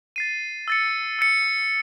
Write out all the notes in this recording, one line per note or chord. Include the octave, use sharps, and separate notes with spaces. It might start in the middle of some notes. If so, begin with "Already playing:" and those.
A6 C7 D#7
E6 A6 C#7
E6 A6 C#7